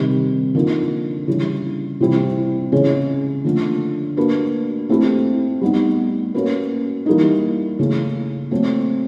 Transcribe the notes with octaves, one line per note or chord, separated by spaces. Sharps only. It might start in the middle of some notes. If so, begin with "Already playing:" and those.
Already playing: C3 D#3 G3
D3 F3 A#3 D#4
C#3 E3 G3
C3 E3 G3 C4 E4
C#3 E3 G#3 C#4
D3 F3 A3
A#3 D4 F#4 B4
A3 C4 E4 G4
G3 B3 D#4
A#3 C#4 F#4 B4
E3 G3 A#3 D#4
C#3 E3 A3 C#4
F#3 A3 C4